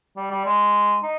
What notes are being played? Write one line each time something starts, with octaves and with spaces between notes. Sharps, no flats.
G3
G3
G#3
D#4